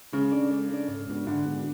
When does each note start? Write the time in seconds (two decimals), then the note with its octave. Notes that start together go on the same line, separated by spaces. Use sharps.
0.13 C#3 G#3
0.32 D4 A4 D5
0.50 G#3
0.70 D4 A4 D5
0.88 G#2
1.08 G#3 B3 D4 F#4
1.26 G#2 D3
1.45 G#3 B3 D4 F#4